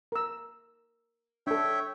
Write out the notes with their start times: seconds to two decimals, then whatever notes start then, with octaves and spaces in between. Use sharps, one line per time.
0.12 A#4 E6
1.47 D4 A4 C#5 E5 G5